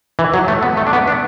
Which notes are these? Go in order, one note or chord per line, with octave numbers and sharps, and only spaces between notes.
E3
F#3
A3
B3
A3
D4
B3
D4